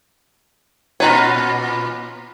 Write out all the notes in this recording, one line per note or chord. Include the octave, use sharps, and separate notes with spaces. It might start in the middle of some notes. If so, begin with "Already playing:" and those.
A#2 C#4 D#4 F4 B4 C#5